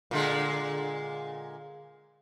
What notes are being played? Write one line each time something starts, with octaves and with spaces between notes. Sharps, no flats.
A#2 D3 G#3